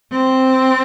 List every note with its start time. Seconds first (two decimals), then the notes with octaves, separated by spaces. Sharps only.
0.12 C4